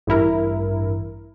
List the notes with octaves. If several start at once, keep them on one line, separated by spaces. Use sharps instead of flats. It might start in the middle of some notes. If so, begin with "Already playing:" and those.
A1 G2 E4 A#4